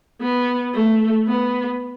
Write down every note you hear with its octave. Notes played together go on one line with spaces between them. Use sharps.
B3
A3
B3